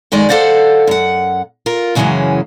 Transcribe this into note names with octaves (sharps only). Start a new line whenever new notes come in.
F#2 D#3 G#3 D5
A4 C5 D5 F5 F#5
F#2 F#5
F4 A#4
F#2 C#3 E3 F#3 G#3 C#4